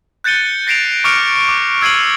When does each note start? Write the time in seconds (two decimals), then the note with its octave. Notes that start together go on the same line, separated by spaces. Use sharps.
0.24 F#6 G6 A6 C#7 D#7 G7
0.67 A6 A#6 C7 D7 E7 F7
1.04 C#6 D6 F6 C#7 D7 F7
1.49 D6
1.81 E6 G#6 C7 D#7 F#7